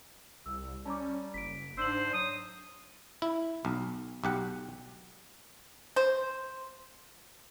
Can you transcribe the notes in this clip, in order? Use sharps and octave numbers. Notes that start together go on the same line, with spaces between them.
C2 E6
G3 C#4 A5 A#5 D6
F#1 B6 D7
G#2 D4 C5 E6 F#7
C7
F#3 D#6
E4
B1
B1 G4 F#5
C5